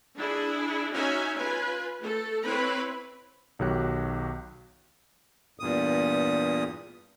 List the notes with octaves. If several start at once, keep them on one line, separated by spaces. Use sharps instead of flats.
D4 E4 G#4
C#4 D#4 F#4 E5 G#5
F4 B4 G#5
A3 A4
C4 E4 B4 C#5 B5
B1 D#3 F#3 G4 F#6
E2 G2 A#2 D#6